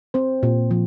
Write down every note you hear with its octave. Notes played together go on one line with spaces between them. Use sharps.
C4 C5
A#2
F3